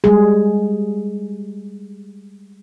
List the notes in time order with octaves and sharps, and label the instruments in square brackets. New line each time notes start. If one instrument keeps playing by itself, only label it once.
[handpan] G3 G#3 G#4